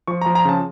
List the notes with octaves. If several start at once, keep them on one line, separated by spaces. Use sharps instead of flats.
F3 C#6
A#5
F3
A#5
C#3 A5